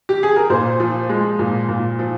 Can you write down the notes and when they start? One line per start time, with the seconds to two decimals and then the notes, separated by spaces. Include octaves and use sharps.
0.09 G4
0.23 G#4
0.36 A#4
0.50 A#2 C5
0.80 F3
1.09 G#3
1.39 A#2
1.69 A#2
1.99 F3